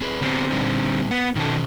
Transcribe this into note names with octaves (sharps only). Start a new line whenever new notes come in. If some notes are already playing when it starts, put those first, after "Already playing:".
C4 G#4 B4
D3 B3 C4 D4 G4
A#2 G3 D#4
B3 F#5
B2 D#3 C#4 A4